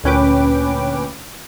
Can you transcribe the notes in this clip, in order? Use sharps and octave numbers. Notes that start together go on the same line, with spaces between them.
D2 A#2 C#4 B4 G5 D6